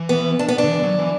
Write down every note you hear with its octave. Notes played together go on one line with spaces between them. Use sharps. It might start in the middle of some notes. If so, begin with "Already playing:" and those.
Already playing: E3
B3
D4
B3
D4
D3
E3
F#3
E3